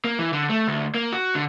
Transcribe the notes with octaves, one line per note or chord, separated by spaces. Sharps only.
A#3
E3
D3
A3
D2
A#3
F#4
D3